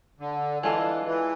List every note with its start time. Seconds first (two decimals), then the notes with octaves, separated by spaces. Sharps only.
0.20 D3
0.63 E3 G#3 D4 F4 A4
1.06 E3